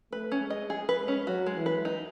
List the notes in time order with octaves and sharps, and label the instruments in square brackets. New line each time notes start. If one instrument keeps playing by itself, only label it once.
[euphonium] A3 [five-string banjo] B4
[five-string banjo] C#4
[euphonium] G#3
[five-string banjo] D#5
G#4
B4
C#4
[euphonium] F#3 [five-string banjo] F#4
[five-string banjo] G#3
[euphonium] E3
[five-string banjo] B4
D#4